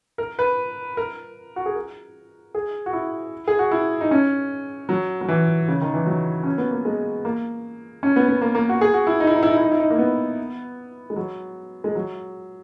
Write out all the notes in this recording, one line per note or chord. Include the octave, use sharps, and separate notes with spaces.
A#4
B4
A#4
F#4
G#4
A#4
G#4
F#4
E4
G#4
F#4
E4
D#4
C#4
F#3
F#3
E3
C#3
D#3
E3
F#3
C#4
B3
A#3
G#3
A#3
C#4
B3
B3
A#3
A#3
F#4
G#4
F#4
E4
D#4
E4
D#4
E4
D#4
E4
D#4
E4
D#4
A#3
B3
G#3
F#3
G#3
F#3